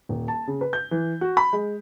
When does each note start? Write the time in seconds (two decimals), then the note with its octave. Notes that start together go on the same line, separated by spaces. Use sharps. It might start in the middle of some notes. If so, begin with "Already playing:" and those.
0.09 D#1
0.28 A5
0.47 C#3
0.61 B4
0.73 G6
0.91 E3
1.21 F#4
1.37 B5
1.53 G#3